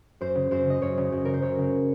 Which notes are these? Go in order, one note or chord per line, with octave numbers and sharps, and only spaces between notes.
F#2 C5
C#3
F#2 C5
C#3 D#5
F#2 C#5
C#3
F#2
C#3 A#4
C5
F#2 C#5
C#3